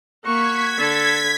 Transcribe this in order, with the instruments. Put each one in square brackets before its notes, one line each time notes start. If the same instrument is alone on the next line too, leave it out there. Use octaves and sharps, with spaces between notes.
[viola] A#3 C#6 [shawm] F#4 [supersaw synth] G#6 B6
[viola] D3 [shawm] A4